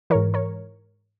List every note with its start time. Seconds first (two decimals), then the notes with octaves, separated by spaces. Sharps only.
0.10 G#2 E3 A#4 C#5
0.34 A#4 C#5